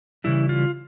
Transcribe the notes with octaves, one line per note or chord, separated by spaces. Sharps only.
C#3 E3 G3 E4
F4